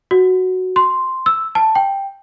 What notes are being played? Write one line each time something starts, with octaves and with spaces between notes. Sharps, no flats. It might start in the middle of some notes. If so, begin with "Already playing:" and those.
F#4
C6
E6
A5
G5